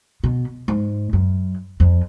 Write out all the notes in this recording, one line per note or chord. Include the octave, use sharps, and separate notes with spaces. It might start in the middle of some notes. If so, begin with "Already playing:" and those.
B2
G#2
F#2
F2